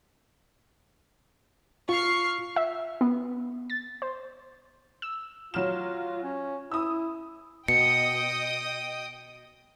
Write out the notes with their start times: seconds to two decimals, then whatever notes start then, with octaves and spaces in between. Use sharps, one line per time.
1.89 F4 C#6 F6 C7
2.56 E5
3.01 B3
3.70 A6
4.02 C5
5.02 E6
5.54 F#3 F4 F6 E7
6.23 C#4
6.72 E4 D#6 E6
7.68 B2 D#5 G5 D#6 C#7